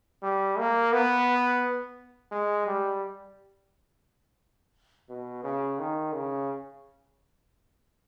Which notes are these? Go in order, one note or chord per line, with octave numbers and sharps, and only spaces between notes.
G3
A#3
B3
G#3
G3
B2
C#3
D#3
C#3